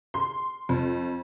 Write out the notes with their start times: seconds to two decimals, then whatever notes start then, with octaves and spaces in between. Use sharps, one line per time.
0.14 C6
0.69 F2